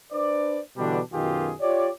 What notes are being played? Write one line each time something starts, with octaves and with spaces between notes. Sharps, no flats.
D4 B4 C5 D5
B2 D3 E3 G3 D4
F#2 B2 D#3 F4 G4 G#4
F4 G4 C#5 D5